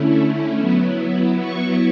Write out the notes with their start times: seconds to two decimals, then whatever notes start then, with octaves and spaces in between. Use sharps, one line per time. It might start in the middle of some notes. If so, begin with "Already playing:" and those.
Already playing: D3 A3 C#4 E4
0.57 F#3 B3 E4
1.40 C#6